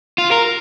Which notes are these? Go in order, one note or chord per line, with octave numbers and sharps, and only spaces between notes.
F4
A#4